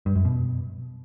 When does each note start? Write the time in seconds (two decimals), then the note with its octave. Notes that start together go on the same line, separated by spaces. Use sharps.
0.06 G2
0.15 F#2
0.25 B2